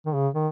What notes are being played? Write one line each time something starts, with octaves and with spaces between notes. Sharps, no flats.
D#3
C#3
D#3